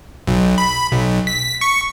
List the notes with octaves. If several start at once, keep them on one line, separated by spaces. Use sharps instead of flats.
B1
B5
B1
B6
C#6